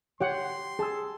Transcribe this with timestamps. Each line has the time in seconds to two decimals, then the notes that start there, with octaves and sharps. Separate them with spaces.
0.20 G4 C#5 F#5 C6
0.79 G#4 A5 E6